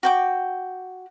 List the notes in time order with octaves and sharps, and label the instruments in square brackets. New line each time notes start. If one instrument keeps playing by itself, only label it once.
[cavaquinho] F#4 G5 D6